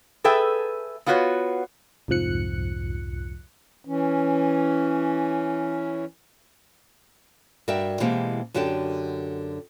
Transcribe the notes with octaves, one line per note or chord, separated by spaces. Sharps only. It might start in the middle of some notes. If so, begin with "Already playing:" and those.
G#4 A4 B4 E5 G5
B3 F4 F#4 B4 C#5
C2 F2 G#2 F3 F#6 C#7
E3 C#4
G2 F#4 A#4 D5 E5 G5
B2 E3 G#3 A#3 C4 G4
F#2 D3 F#4 G4 G5 A5